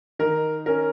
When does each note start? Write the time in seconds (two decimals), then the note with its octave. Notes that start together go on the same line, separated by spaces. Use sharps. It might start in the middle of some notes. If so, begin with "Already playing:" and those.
0.19 D#3 A#4
0.66 C#4 A#4